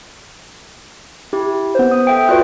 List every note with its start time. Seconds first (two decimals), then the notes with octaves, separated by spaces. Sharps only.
1.33 E4 G4
1.75 B3 B4 C5
1.91 D#6
2.07 A4 E5 G5
2.29 F4 F#4 B4 C5 D5 F#6